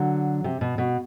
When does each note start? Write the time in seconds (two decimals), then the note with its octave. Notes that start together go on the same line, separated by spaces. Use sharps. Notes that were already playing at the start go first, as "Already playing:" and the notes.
Already playing: D3 F#3
0.44 C3
0.61 B2
0.78 B2